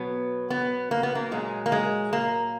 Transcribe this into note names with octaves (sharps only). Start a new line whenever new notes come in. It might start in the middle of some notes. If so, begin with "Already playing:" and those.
Already playing: B2 F#3 B3
B3
A#3
B3
A#3
A#2 F#3 G#3
A#3
G#3
A#3